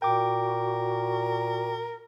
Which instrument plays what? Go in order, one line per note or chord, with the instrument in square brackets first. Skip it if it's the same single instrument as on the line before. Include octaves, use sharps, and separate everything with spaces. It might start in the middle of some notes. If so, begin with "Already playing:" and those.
[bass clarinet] A#2 [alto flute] F#4 [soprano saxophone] A#4 [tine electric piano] G5 D6